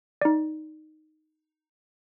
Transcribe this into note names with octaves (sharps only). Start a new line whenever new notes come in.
D#4 D5